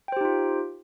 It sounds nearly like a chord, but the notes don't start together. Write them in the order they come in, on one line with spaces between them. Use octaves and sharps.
G5 C5 G4 D#4 F4